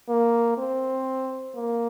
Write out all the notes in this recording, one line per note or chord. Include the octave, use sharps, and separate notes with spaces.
A#3
C4
A#3